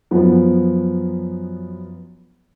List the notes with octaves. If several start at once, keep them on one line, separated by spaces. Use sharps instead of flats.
F#2 F3 B3